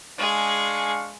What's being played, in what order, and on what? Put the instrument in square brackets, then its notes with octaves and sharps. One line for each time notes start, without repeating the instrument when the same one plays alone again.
[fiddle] G#3 G#4 [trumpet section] D4 F5 C#6